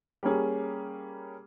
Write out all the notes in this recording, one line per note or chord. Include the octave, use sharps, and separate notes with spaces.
G3 A#3 C#4 G#4